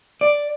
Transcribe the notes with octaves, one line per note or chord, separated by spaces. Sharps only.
D5